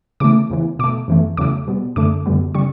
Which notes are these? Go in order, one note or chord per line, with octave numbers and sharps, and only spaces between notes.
C#3 E3 A3 D6
E2 C#3 E3
B2 A3 D6
F#2 E3 A3
E2 C#3 F#3 A3 D6
B2 G3 B3
F#2 D3 A3 D6
F#2 D3 G3 B3
C#3 G3 C#6